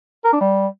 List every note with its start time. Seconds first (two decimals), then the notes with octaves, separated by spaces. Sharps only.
0.24 A#4
0.32 D4
0.41 G3